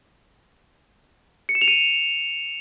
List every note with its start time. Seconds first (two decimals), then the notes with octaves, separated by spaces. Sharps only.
1.49 C#7
1.55 E7
1.61 F7
1.68 D#7